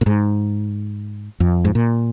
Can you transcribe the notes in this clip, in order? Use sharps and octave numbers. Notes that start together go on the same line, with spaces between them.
A#2
G#2
F2
G#2
A#2